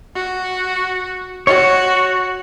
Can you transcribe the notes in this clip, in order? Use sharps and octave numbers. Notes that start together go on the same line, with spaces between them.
F#4
F#4 C#5